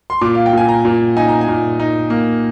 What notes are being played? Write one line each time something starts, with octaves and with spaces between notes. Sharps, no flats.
C6
A#2 D6
F5
G5
A#2 G#5
A#5
A#2
D#4 G#5
A#5
G#5
A#2
D#4
A#3